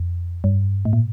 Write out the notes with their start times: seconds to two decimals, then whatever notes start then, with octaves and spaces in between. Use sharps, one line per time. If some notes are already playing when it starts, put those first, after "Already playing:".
Already playing: F2
0.44 G2
0.85 A2
0.93 A#2